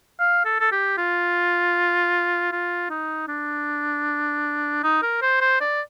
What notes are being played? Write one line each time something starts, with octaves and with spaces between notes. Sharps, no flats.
F5
A4
A4
G4
F4
F4
D#4
D4
D#4
A#4
C5
C5
D5